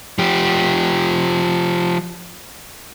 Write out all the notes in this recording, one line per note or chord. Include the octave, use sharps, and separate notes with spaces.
F3 G4